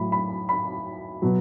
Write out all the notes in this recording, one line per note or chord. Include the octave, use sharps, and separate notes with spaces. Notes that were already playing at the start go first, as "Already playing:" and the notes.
Already playing: A2 F#3 B5
B5
B5
B2 F#3